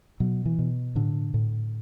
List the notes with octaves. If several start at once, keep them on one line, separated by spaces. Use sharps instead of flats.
B2 F#3
E3
B2
A2 D3
A2